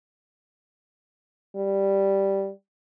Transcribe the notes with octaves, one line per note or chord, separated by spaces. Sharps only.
G3